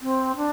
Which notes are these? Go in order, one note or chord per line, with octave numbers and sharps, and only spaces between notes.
C4
D4